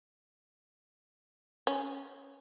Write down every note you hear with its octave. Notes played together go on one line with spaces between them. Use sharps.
C#4